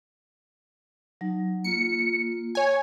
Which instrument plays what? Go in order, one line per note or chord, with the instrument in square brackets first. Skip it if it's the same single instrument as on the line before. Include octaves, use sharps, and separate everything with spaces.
[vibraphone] F#3 D#4
[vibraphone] A#3 F4 [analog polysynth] C#7
[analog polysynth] C#5 G#5